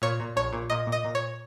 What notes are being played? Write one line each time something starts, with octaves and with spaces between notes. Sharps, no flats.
A#2 C#5
A#2
A#1 C#5
A#2
A#2 D#5
A#2
D#5
A#2
C#5